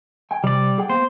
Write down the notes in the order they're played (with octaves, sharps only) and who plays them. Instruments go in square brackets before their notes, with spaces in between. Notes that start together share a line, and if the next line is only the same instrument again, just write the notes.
[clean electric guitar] G5 G#5
[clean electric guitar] C3 [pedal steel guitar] G3 D5
[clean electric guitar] G#4 F#5 G5
[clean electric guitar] A#3 B3 [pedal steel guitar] C5